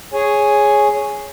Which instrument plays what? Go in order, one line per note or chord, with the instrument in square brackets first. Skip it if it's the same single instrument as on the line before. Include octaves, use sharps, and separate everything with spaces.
[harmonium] G#4 C#5 G#5